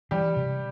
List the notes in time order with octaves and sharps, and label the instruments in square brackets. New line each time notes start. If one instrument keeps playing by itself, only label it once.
[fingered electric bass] E3 [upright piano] G3 G4
[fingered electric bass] C3